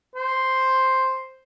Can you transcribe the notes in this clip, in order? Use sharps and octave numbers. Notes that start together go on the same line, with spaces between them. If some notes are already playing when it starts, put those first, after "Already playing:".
C5